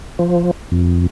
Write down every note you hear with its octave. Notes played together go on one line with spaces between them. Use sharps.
F3
F2